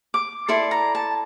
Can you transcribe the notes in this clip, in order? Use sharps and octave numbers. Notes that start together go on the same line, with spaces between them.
D6
E4 A4 D5 C6
A#5
A5